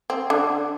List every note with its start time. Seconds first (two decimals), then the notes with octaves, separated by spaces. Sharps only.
0.10 C4
0.30 D3 D4